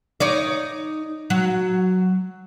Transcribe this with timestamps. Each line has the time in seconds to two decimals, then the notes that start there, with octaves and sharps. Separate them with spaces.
0.20 D#4 C#5 D5
1.30 F#3